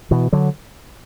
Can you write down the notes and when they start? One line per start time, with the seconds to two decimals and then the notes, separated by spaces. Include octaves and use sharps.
0.11 B2 E3
0.33 D3 F#3